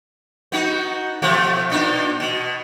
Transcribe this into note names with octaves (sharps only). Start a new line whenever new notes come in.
B3 D#4 F#4
B2 F3 A3
A#2 D4 D#4
B2